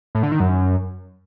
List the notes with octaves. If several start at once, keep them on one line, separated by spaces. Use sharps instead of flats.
A2
D3
D#3
F#2